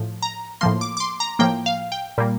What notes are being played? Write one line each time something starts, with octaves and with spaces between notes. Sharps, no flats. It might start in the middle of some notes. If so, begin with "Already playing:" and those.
Already playing: A2 F3
A#5
A2 F3 A#3 C6
D6
D6
C6
A#5
A2 F3 A#3 G5
F5
G5
A#2 G3 A#3